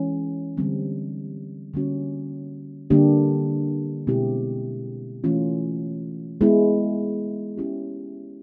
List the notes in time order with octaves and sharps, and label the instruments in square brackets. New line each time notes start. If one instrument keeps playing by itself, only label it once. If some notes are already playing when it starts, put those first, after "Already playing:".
Already playing: [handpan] E3 G#3 C#4
D3 G3 C4
D3 G3 A#3 C#4 F#4
D3 G3 A#3 D4 G4
B2 G#3 C4 E4 G4
E3 A3 C#4 F4
G#3 B3 E4
G#3 C#4 E4 G4